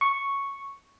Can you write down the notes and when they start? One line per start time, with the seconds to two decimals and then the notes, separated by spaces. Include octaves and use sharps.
0.01 C#6